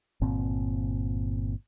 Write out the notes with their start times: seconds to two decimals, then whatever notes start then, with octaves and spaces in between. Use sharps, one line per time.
0.21 G1 A#2 C4